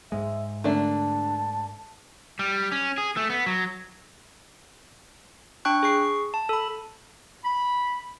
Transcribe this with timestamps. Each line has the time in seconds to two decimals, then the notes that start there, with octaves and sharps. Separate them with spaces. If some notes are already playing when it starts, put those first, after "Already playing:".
0.12 G#2 G#3 E5
0.64 D3 A3 A#3 D4 A5
2.39 G3
2.72 C#4
2.98 G#4
3.17 A3
3.30 B3
3.46 F#3
5.65 D4 G5 C#6 F#6
5.83 G#4 C#6 C7
6.34 A5
6.49 A4 B5
7.45 B5